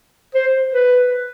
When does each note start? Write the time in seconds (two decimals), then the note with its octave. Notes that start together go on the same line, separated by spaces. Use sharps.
0.35 C5
0.74 B4